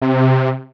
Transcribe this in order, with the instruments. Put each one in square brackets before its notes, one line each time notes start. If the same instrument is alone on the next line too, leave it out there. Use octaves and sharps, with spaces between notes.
[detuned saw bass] C3